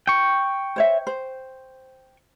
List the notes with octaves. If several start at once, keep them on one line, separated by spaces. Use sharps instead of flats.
G5 C#6
C5 C#5 E5
C5